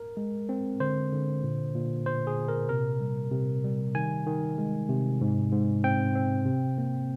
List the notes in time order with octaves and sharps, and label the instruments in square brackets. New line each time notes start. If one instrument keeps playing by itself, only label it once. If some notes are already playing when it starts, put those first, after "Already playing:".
Already playing: [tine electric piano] A#4
G#3
C4
D3 C5
D3
A#2
A#2
A#2 C5
G#4
A#2
A#4
C3 A#4
G3
C3
G3
D#3 G#5
D#3
G#3
C3
G#2
G#2
C4 G5
C4
C3
A#3